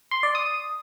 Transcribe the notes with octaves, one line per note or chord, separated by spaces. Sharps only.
C6
D5
D#6